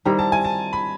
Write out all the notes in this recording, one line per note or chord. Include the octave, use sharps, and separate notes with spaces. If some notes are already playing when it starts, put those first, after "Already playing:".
D#3 G3 C4 E4 A#5
A5
G#5
A5
B5